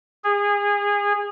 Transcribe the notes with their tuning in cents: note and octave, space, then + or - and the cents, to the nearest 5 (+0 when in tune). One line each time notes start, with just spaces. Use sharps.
G#4 -25